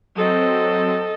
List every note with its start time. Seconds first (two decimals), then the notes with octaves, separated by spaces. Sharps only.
0.16 F#3 C4 A4 D#5